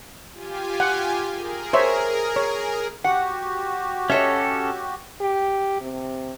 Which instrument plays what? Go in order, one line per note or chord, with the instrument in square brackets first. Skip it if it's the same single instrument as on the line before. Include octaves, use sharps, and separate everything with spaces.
[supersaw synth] F4 G4 G#5
[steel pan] F#5
[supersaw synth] G#4 A#4
[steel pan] C5 C#5 E5
C#5
[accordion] F#4 G4 [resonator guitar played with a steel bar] F#5
[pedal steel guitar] C#4 A4 [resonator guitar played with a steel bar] C#5 D#5 E5
[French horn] G4
C3